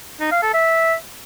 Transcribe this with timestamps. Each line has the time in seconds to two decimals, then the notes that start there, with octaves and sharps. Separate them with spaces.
0.20 D#4
0.32 F5
0.43 A4
0.54 E5